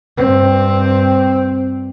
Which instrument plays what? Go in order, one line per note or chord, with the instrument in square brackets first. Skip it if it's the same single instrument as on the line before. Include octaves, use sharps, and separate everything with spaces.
[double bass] G2 C4